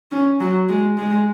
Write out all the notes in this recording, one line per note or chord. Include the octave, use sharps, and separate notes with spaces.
C#4
F#3
G#3
G#3